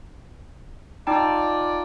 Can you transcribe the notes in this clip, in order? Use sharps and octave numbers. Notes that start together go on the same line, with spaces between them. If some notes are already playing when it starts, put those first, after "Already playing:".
D#4 F4 D5 G5 A5